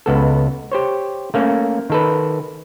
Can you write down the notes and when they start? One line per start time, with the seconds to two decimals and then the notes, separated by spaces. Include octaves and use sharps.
0.06 C#2 B3 A4
0.72 G4 C5 C#5
1.34 A3 A#3 C#4
1.90 D#3 A4 B4